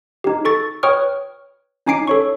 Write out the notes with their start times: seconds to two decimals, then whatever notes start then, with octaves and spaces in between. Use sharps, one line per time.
0.24 D#4 G4
0.45 A4 C#6 A6
0.83 B4 C#5 G5 C#6 D#6 F6
1.87 C#4 D#4 G#5 D6 C7 D7
2.07 A4 C#5 C#6